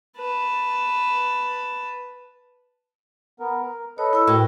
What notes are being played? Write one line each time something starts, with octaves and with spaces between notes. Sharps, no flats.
B4 A5
B3 A#4
A#4
A4 B4 C#5 D#5
E4 E6
A2 F#4 A#4 G5